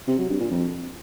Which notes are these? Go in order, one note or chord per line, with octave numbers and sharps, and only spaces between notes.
C3
F#3
G2
A#2
F2